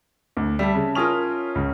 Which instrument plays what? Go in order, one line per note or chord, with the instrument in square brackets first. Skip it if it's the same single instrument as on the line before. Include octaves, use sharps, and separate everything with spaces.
[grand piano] D2
[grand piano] G3 [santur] E5 A5
[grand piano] C#3
[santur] C#4 A#4 [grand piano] F4 D#6 F7
[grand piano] C#2